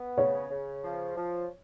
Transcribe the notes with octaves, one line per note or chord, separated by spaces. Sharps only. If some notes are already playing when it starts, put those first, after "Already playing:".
Already playing: B3
C#3 C#5
C#3
F3
F3